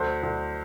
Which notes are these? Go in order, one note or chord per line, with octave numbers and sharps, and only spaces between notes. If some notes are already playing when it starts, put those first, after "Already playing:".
Already playing: D2 C5
D2